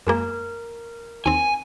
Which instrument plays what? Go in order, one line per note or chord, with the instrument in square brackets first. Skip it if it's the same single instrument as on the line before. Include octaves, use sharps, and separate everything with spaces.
[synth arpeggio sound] F#2 G#3 A#3 [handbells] A#4
[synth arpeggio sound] D#2 C4 [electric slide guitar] G#5